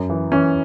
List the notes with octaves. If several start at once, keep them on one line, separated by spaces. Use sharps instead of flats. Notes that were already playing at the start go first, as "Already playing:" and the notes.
Already playing: F#2
E3
E3 C#4